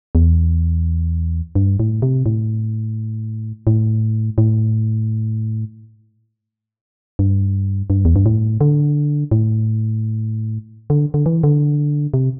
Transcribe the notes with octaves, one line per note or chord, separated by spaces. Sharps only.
E2
G2
A2
C3
A2
A2
A2
G2
G2
E2
G2
A2
D3
A2
D3
D3
E3
D3
C3